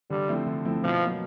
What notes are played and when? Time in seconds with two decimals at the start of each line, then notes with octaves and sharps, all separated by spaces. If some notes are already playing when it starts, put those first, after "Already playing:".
0.10 D3 G3
0.28 F3 A3 C4 E4
0.47 D3
0.65 F3 A3 C4 E4
0.84 B2 F3
1.02 F#3 A#3